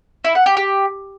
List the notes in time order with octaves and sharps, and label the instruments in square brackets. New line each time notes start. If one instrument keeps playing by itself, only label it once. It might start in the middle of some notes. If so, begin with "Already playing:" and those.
[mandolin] E4
F#5
G4
G4